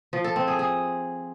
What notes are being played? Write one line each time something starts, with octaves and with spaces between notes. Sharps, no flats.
F3
A4
C4
G#4
G#4